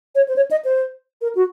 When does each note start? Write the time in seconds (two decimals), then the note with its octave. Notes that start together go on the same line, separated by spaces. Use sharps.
0.15 C#5
0.28 C5
0.36 C#5
0.51 D#5
0.65 C5
1.21 A#4
1.35 F#4